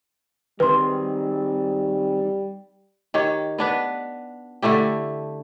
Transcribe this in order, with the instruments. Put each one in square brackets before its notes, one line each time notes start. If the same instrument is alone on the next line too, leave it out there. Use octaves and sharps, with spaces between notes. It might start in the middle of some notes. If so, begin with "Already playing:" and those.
[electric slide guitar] D#3 C4 [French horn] G3 [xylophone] B4 C6
[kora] D#3 G4 C#5
B3 D4 B4
D3 A3 E4 G4